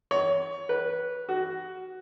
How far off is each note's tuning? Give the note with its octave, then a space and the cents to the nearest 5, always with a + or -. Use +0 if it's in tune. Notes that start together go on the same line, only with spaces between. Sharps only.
C#5 +20
B4 -10
F#4 +10